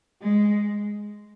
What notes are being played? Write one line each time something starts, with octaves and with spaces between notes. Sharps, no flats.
G#3